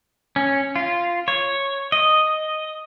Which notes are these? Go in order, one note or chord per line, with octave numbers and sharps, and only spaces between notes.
C#4
F4
C#5
D#5